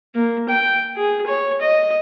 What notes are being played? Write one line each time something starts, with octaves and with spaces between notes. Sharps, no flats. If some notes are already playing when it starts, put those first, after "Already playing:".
A#3
G5
G#4
C#5
D#5